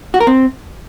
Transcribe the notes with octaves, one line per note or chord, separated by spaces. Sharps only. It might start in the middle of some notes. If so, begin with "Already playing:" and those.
F#4
A#4
C4